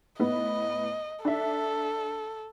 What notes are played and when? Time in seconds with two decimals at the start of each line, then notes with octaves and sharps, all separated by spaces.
0.19 A2 B3 D#5
1.25 D4 A4 E5